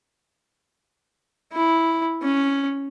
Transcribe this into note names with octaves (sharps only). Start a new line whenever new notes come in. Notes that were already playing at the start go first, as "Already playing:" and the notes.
E4
C#4